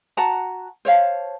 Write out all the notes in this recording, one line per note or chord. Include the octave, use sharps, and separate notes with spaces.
F#4 F#5 A5 A#5
C5 C#5 F5 A5